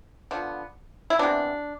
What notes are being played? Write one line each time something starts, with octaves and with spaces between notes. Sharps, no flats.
D3 F3 B3
E4
C3 E3 B3 D4